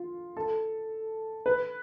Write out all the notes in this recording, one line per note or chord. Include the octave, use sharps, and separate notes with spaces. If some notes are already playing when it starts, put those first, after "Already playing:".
Already playing: F4
A4
B4